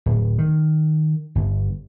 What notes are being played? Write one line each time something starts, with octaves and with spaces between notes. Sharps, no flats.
D1
D#3
G1